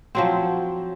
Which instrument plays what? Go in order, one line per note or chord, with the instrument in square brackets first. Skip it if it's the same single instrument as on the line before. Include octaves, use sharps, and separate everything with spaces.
[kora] F3 F#3 C4